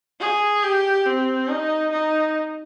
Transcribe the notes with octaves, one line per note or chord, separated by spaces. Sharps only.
G#4
G4
C4
D#4
D#4